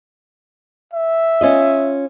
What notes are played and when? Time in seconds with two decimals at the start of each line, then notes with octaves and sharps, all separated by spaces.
0.94 E5
1.41 C#4 F4 D#5